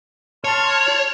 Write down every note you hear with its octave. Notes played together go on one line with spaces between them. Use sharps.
C#5 A5 C6 F6